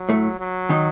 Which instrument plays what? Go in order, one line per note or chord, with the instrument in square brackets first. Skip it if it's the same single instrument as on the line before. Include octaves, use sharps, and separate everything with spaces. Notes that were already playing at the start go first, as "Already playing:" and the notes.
Already playing: [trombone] F#3
[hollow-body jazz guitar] A2 A3
[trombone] F#3
[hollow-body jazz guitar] D#3 D#4